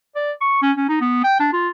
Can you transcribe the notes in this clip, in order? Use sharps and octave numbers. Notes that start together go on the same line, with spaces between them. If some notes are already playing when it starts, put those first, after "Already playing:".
D5
C#6
C#4
C#4
D#4
B3
G5
D4
F4